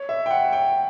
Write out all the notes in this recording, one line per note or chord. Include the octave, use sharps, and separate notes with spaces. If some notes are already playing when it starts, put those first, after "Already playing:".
Already playing: C#5
E5
G5
F#5
G5